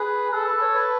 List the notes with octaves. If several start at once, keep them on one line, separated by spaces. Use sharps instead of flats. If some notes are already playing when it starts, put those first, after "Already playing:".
Already playing: G#4 B4
G#4 A4
B4
B4
C#5
B4